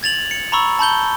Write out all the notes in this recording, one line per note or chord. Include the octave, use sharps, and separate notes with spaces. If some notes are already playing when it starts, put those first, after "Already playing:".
G#6 A6 F7 F#7
C#7
A#5 B5 C#6 E6
A5 B5 G6 G7